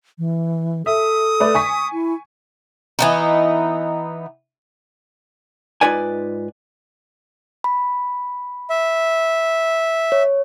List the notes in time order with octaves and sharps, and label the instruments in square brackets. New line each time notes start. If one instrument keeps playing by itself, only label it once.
[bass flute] E3
[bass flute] A4 [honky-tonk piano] E5 [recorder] D#6
[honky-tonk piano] A3 B4 D5
G#5 C#6 B6
[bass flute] E4
[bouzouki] E3 B3 D#4
[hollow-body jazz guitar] G#2 D#4 F4 B4 D5 G#5
[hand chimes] B5
[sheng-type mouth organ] E5
[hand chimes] C#5